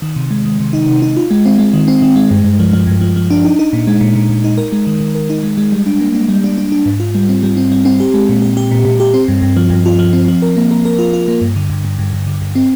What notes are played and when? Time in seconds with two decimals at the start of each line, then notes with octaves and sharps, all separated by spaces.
0.02 D#3
0.16 C3
0.30 G#3
0.45 D#3
0.60 C3
0.73 D#4
0.88 C3
1.02 D#4
1.16 F4
1.31 G#3
1.46 C4
1.59 G#3
1.73 D#3
1.88 C4
2.02 D#3
2.16 G#3
2.31 G2
2.44 G2
2.59 F3
2.73 F3
2.87 G2
3.01 F3
3.16 F3
3.31 D4
3.44 D#4
3.59 D#4
3.73 A#2
3.87 G#3
4.01 A#2
4.15 A#2
4.29 A#2
4.44 D#4
4.58 A#4
4.72 G#3
4.87 D#3
5.01 D#3
5.15 A#4
5.30 D#4
5.43 G#3
5.58 G#3
5.72 G3
5.86 D4
6.01 A#3
6.14 D4
6.29 G3
6.44 D4
6.58 D4
6.72 D4
6.86 G#2
7.00 F4
7.15 G3
7.29 C4
7.43 G3
7.57 C4
7.72 G3
7.85 C4
8.00 G4
8.14 G#3
8.29 A#2
8.42 G4
8.57 G4
8.71 A#2
8.85 A#2
9.00 G4
9.14 C4
9.28 G2
9.42 G2
9.57 F3
9.70 G2
9.86 F4
9.99 F3
10.13 C4
10.28 F3
10.42 A#4
10.57 A#3
10.71 A#4
10.85 A#4
10.99 F4
11.13 F4
11.28 A#3
11.41 G2
11.56 D3
11.70 G2
11.85 G2
11.99 G2
12.13 G2
12.27 D3
12.42 G2
12.55 C4